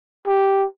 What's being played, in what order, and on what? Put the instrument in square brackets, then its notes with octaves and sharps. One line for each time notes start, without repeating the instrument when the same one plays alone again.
[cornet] G4